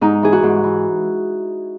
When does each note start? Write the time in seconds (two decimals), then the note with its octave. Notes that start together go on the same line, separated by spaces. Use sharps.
0.01 G#2 D#4
0.23 E3 G#4
0.32 F#4
0.43 G#2
0.64 E3